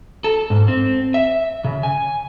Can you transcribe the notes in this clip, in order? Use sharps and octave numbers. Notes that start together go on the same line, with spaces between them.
A4
G#2
C4
E5
C#3
G#5